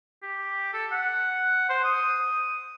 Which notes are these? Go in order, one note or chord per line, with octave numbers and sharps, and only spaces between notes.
G4
A4
F#5
C5
D#6